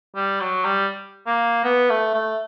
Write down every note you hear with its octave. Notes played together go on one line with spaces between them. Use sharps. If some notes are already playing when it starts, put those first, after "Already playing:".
G3
F#3
G3
A#3
B3
A3
A3